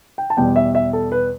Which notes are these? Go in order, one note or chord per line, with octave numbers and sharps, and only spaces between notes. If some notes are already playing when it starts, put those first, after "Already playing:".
G5
A5
E2 B2 G3 G5
E5
E5
A4
B4